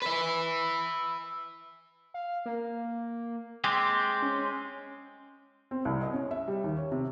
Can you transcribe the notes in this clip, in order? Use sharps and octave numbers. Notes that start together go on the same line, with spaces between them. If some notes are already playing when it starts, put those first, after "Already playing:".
B4 E5
F5
A#3
G#3 C4 G4 G6
C#4
C4
C2
D#5
C#4
E5
G3
D#2
C#5
C3